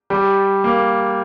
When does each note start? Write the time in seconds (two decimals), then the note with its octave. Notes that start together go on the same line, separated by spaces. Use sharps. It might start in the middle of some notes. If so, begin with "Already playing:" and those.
0.10 G3
0.64 A#3